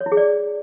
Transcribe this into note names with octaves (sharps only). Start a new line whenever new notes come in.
C#5
E4
G#4
D5